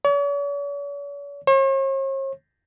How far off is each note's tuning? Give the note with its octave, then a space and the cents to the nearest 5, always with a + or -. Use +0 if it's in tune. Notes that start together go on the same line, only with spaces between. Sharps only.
C#5 +45
C#5 -45